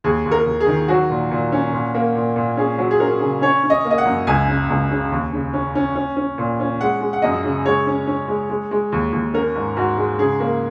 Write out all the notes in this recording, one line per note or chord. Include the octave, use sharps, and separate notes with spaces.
D#2 G#4
D#2
A#4
D#2
G#4
D#3
F#3 F#4
A#2
A#2
C#4
A#2
A#3
A#2
A#2
C#4 G#4
F#3
G#4
C#4 A#4
C#3
C#4 C#5
C#4
D#5
A#3
D#5
F#5
F#2
C#2 G#5
C#3
C#2
C#3
D#2
C#3
C#4
C#4
C#4
C#4
A#2
C#4
G#3 F#5
G#3
F#5
F#2 D#5
C#3
G#3 C#5
C#4
C#4
G#3
G#3
G#3
D#2
D#2
C#4 A#4
G#2
G#2 F#4
G#3
C#3 G#4
A#3